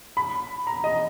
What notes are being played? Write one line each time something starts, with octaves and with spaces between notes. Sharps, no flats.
B5
A#5
D#5